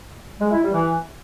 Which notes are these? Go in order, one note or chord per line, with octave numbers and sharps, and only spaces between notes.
G#3
E4
G3
E3